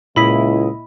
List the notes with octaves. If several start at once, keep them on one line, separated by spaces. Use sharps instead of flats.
C#2 A#2 E4 D#5 B5 B6